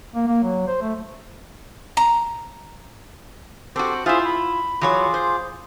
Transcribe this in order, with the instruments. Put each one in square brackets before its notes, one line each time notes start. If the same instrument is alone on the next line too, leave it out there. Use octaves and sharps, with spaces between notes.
[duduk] A#3
A#3
F#3
C5
A3
[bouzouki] A#5
[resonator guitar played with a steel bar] C4 F#4 [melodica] G4 A4
[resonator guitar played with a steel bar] E4 F4 [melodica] G#4 C5 E5
[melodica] B5
[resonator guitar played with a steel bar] E3 F#3 C#5 [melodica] F4 G#4 D6
[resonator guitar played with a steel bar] C5